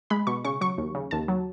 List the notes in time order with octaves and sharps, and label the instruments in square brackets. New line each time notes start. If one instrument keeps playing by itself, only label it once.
[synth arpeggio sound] G#3 B5
B2 C#6
C#3 C#6
F#3 C#6
D#2
C#3
D#2 A5
F#3